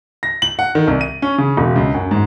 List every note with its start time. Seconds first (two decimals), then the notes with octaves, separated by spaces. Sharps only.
0.23 A#6
0.42 F#7
0.59 F#5
0.75 D#3
0.87 C2
1.01 D#7
1.22 C#4
1.38 C#3
1.57 E1
1.76 C#2
1.94 F#2
2.11 G#2